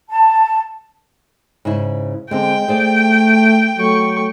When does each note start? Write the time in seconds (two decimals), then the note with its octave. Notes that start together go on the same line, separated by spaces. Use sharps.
0.09 A5
1.65 G#2 C#3 E4
2.31 D3 G#3 C4 G5
2.68 A3 G#4 C5 D5
3.78 F#3 A3 C#6